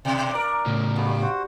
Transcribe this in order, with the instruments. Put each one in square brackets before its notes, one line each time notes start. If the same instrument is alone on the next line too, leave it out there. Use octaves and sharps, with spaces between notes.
[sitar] B2 [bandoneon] D4
[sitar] A#4 D5
[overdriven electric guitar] A2 C#3
[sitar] G2 [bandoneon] B2 A3 B3
[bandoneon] F#4 C5 F#5